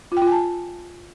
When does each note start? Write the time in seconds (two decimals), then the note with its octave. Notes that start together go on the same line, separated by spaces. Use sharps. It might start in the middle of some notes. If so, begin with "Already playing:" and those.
0.12 F4
0.17 G5
0.22 F4
0.27 G#5
0.32 A5